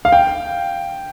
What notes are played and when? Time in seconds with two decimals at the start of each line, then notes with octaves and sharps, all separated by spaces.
0.05 F5
0.12 G5